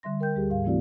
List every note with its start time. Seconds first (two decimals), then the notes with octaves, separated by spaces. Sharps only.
0.03 D3 G3 E5 C6 A#6
0.20 A#4 G5 G6
0.36 D2 G3 G4 G#4
0.50 G#2 F5
0.64 E3 A3 C4 E4 F#4 D5